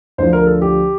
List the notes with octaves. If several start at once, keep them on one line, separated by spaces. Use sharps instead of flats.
D2 D3 F3 C5
A#4
A4
G4